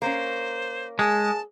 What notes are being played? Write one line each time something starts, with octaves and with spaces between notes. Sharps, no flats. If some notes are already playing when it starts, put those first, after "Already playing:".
A#3 C#4 C5
G#3 G#4 A5